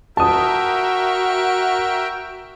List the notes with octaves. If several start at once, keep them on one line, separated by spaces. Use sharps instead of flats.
F#4 A#4 E5 G5 A5 D#6